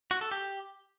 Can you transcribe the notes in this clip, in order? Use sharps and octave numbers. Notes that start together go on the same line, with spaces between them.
F#4
A4
G4